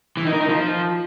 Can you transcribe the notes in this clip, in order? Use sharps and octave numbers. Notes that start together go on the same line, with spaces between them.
E3
D#4
A#4
D#4
F3